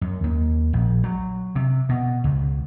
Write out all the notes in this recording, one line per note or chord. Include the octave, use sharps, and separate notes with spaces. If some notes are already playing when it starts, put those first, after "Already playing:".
F#2
D#2
A#1
F#3
C3
B2
C#2